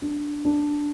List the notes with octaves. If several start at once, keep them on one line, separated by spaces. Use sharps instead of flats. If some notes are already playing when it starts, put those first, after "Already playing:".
D4
D4